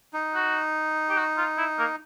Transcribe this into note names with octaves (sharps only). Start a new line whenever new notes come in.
D#4
F#4
G4
F#4
F4
E4
A#3